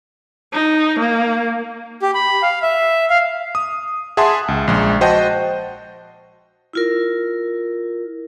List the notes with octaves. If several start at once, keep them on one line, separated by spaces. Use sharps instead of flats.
D#4
A#3
G4
B5
F5
E5
F5
D#6
G#4 E5 F#5 A5 C6
C#2
A#1 G#3
F#4 C5 D#5 F#5 G5 A5
E4 F4 A#4